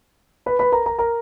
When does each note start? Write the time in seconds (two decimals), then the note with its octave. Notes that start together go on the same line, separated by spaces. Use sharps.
0.46 B4 B5
0.59 B4 B5
0.72 A#4 A#5
0.86 A#4 A#5
0.98 A#4 A#5